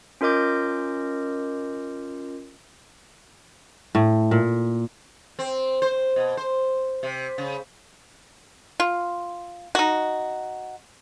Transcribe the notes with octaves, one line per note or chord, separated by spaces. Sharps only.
C#4 F4 A#4 D#5 D6 G6
A2
A#2
C4
C5
B2
C5
C3
C#3
F4
D#4 F#4